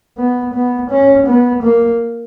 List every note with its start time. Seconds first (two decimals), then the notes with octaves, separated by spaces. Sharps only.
0.18 B3
0.54 B3
0.90 C#4
1.27 B3
1.63 A#3